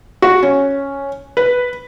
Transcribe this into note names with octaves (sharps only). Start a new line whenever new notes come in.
F#4
C#4
B4